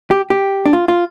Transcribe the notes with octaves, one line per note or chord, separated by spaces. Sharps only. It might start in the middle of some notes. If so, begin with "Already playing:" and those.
G4
G4
D4
F4
F4